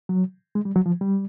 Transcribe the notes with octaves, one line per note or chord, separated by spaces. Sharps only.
F#3
G#3
G3
F#3
F3
G3